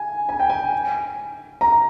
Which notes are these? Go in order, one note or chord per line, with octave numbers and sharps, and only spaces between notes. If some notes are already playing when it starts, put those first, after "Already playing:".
Already playing: G#5
G#5
G5
G#5
A#5